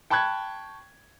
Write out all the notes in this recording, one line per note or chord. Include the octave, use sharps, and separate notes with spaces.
G5 A5 B5 C#6 F#6 G#6